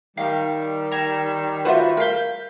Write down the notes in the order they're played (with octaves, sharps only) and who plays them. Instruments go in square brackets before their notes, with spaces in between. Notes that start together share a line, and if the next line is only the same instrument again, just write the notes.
[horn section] D#3 G3 [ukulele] D#5 F5 G5
[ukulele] G5 [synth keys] A#5 G#6 E7
[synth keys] F4 F#4 B4 [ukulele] C5 E5
[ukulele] A#4 F5 [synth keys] G6 B6